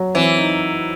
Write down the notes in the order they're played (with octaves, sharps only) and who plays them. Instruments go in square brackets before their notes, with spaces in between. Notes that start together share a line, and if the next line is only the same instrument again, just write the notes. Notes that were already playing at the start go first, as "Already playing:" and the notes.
Already playing: [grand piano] F#3
[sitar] E3 [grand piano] C4
[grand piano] D#4